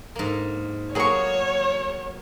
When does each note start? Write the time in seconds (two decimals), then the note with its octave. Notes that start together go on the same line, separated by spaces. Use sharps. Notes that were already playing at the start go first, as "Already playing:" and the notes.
0.16 G#2 A#3
0.95 F#3 A#3 B3 G#4 C#5 C#6